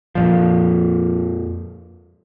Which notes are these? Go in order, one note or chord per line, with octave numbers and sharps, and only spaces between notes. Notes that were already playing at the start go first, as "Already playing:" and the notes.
F2 A#2 F3